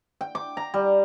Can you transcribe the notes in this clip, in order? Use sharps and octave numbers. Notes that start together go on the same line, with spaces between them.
G5
D6
A#5
G3